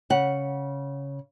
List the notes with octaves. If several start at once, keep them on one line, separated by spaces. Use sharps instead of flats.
C#3 F#5